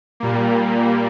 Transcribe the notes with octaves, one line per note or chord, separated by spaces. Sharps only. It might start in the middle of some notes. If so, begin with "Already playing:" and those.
A#2 G3 A#3